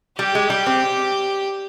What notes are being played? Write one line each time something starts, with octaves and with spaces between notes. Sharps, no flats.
G3 G4
G#3
G3
C4